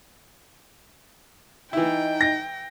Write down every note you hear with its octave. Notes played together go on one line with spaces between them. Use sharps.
E3 D#4 E4 G5
A#6